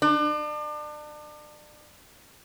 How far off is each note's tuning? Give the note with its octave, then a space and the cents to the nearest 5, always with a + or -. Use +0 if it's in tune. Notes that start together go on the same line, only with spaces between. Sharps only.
D4 +35